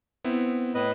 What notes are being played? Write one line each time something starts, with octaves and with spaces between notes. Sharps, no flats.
B3 C4 E4
A2 B4 D#5